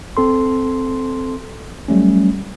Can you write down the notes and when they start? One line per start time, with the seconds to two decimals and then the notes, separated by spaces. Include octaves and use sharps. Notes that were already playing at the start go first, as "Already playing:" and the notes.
0.17 C4 A4 C6
1.88 F#3 G3 A3 C#4